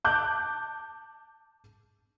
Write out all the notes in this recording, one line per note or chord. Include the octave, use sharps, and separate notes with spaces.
A5 D6 F#6 G6